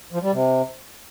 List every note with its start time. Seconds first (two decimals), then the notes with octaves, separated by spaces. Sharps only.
0.12 F3
0.22 G3
0.32 C3